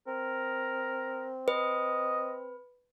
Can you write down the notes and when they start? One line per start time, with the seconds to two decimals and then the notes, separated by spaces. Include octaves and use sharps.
0.07 C4 A#4
1.48 B4 D#5